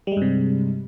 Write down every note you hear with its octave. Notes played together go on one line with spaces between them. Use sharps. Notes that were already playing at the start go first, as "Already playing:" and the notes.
G2 C3 G3 G#3